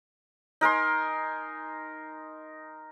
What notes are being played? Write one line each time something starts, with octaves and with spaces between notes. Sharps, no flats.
D#4 A#4 G#5 C6